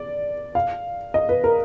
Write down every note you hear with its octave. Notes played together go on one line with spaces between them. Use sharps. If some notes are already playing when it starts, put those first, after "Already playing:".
Already playing: D5
F5
D#5
B4
A#4